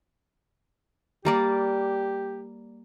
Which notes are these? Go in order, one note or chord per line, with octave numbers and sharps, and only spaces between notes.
G3 A#3 G4 D5